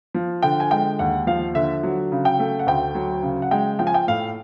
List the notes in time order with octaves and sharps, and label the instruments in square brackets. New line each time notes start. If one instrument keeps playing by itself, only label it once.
[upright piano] F3
D3 G5
G#5
G#3 G5
D#2 F#5
F3 F5
D3 E5
F#3
C#3
G5
A3
F#5
D2 G5
F#3
C#3
F#5
G#3 G5
F3 G5
G#5
G5
A2 F5